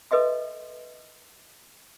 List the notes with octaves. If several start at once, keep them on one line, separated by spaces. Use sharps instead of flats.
A4 B4 D#5 E5 C6